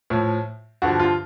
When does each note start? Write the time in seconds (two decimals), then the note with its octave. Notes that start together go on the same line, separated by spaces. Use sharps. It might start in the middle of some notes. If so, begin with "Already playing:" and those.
0.10 A2 F3
0.82 G2 D3 F3 F#4
1.00 F4